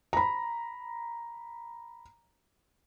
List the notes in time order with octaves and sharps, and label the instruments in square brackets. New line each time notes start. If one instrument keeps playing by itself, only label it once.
[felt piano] A#5 B5